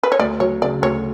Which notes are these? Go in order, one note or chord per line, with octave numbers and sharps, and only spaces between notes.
B4
C#5
D2 D5
F#3 C#5
C#3 D5
D2 C#5